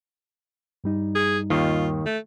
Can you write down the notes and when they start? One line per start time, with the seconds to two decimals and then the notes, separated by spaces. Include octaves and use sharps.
0.84 G2 G3 D#4
1.15 G#4
1.50 D#2 D#3 F4
2.06 A3